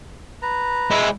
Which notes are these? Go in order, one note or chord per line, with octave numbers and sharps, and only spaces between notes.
B4 A#5
G#3 E4